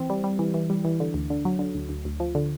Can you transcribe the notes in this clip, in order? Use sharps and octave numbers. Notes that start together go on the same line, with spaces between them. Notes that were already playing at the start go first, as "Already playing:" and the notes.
Already playing: E3 C4
G3
G3
E3
E3
G3
E3
D3
D2
D3
F#3
D3
D2
D2
D2
F3
D3